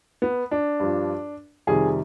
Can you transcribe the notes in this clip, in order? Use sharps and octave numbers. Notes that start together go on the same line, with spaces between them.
B3
D4
G2 F3
F2 C3 D#3 G3 G#4